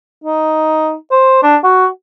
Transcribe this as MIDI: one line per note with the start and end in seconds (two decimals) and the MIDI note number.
0.24 0.94 63
1.12 1.41 72
1.43 1.56 62
1.64 1.87 66